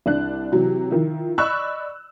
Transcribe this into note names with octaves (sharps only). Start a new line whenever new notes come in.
C2 D4 F#6
C3 E3 F#3
D#3 F3 E4
D5 D#5 B5 C#6 E6 F#6